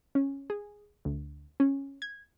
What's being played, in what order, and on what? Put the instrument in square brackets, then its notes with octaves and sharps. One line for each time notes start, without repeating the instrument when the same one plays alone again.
[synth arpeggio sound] C#4
G#4
D2
C#4
G#6